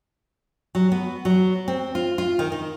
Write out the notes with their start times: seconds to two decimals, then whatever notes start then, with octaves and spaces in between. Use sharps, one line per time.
0.75 F#3
0.92 B3
1.25 F#3
1.68 C4
1.95 F4
2.18 F4
2.39 D#3
2.52 D#3